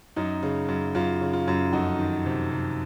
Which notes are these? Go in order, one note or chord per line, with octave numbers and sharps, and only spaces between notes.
F#2 D#4
C#3
F#2
F#2 F4
C#3
F4
F#2
F2 D#4 F#4
D#3
C3
C3